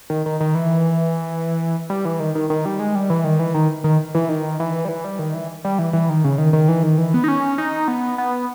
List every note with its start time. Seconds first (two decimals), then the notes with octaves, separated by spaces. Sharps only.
0.10 D#3
0.26 D#3
0.40 D#3
0.55 E3
1.90 G3
2.05 E3
2.20 D#3
2.35 D#3
2.50 D#3
2.65 G3
2.80 G#3
2.95 G3
3.10 E3
3.24 D#3
3.39 E3
3.54 D#3
3.84 D#3
4.15 E3
4.29 D#3
4.60 E3
4.85 G3
4.89 E3
5.04 G3
5.19 D#3
5.34 E3
5.65 G3
5.79 E3
5.93 E3
6.09 D#3
6.24 C#3
6.38 D#3
6.53 D#3
6.69 E3
6.83 D#3
6.98 E3
7.14 B3
7.24 D#4
7.28 C#4
7.58 D#4
7.88 B3
8.18 B3